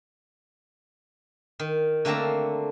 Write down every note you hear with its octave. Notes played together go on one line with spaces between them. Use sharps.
D#3
D3 A3 A#3 C4 A5 A#5